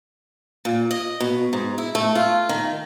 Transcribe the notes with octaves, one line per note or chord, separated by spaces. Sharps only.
A#2
D#5
B2
G#2
E4
A3
F4
D#3